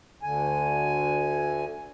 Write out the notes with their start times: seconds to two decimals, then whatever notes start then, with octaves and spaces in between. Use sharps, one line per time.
0.23 D2 D3 G#5